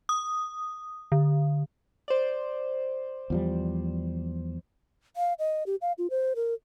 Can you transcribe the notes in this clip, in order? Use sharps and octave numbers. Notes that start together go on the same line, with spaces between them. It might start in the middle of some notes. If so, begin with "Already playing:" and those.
D#6
D3
C5 D5
E2 F3 G3
F5
D#5
G4
F5
F4
C5
A#4